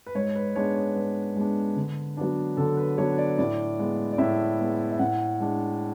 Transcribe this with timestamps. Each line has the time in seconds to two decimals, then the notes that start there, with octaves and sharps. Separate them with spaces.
0.06 B4
0.15 G#2 C#5
0.36 B4
0.55 G#3 B3 D4 C#5
0.76 C#5
0.95 G#2 B4
1.36 G#3 B3 D4
1.76 D3
2.17 F#3 B3 D4
2.57 D3 A4
2.77 B4
2.98 F#3 B3 D4 C#5
3.18 D5
3.38 A2 D5
3.79 G#3 B3
4.12 D5
4.18 A2 E5
4.59 G#3 B3
4.92 E5
4.99 A2 F#5
5.40 G#3 D4